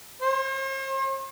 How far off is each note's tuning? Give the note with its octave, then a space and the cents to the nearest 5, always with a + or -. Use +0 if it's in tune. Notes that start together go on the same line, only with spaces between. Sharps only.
C5 +45